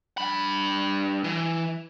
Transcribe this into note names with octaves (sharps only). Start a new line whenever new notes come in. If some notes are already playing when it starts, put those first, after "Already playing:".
G2 B5
E3